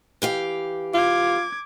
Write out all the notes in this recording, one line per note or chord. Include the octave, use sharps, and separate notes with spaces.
E3 G4 F5
F4 D6 G#6